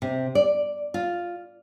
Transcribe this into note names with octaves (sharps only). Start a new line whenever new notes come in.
C3
D5
F4